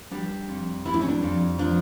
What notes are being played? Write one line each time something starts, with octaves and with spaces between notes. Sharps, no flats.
G3 D4
F2
G3 E4
D4
C#4
D4
F2
F3 D4